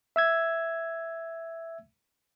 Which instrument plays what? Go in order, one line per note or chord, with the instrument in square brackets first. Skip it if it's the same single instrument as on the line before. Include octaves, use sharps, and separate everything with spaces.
[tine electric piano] E5 E6 G#6